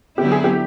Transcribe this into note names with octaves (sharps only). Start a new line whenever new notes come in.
D3 F#3 B3 E4 G4
G#4
G4